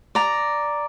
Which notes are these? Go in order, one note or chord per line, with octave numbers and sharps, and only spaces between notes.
D5 A#5